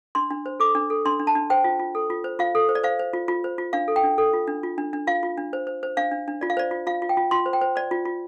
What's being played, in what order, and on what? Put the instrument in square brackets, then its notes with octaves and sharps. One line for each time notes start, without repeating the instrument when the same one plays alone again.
[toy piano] D4 C6
D4
C5
A4 D6
D4
A4
D4 C6
D4
A5
D4
C5 G5
F4
F4
A4
F4
C5
F4 F5
A4
C5
D5
C5 F5
C5
F4
F4
C5
F4
D4 F5
A4
G5
D4
A4
F4
D4
F4
D4
D4
F4 F5
F4
D4
C5
C5
C5
D4 F5
D4
D4
F4 D5
F5
C5 D5
F4
F4 F5
F4
G5
F4
F4 C6
C5
G5
C5
C5 D5
F4
F4